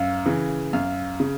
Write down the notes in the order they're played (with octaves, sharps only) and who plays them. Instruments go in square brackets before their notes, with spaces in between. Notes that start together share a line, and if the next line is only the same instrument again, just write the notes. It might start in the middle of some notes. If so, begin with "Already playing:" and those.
Already playing: [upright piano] F#2 [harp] F5
[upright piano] C#3 E3
[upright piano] F#2 [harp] F5
[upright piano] C#3